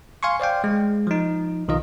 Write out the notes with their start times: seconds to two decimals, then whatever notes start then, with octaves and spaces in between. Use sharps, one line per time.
0.23 F5 G#5 C6 C#6
0.40 C5 D5 F5 G5
0.64 G#3
1.07 F3 D#4
1.68 B1 D#3 F4 D#5